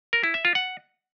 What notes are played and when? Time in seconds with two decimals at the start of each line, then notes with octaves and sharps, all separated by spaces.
0.13 A#4
0.24 E4
0.34 E5
0.45 F4
0.55 F#5